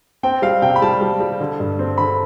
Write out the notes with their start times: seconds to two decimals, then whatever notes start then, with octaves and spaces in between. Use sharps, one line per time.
0.23 C4 G5
0.42 G3 F5
0.62 C3 G5
0.76 B5
0.82 G3 A5
1.01 G3
1.20 G3
1.40 D3
1.60 G2
1.79 C4
1.98 D3 B5